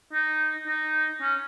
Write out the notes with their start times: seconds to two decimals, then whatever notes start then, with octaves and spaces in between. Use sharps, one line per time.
0.13 D#4
0.67 D#4
1.21 C#4